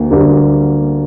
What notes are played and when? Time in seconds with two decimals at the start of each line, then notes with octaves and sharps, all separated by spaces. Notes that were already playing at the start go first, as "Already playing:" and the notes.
Already playing: D2 A#3
0.11 D2 D3 G3 A#3